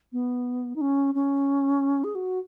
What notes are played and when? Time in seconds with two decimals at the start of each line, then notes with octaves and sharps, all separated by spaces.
0.13 B3
0.76 D#4
0.81 C#4
1.15 C#4
2.04 G#4
2.15 F#4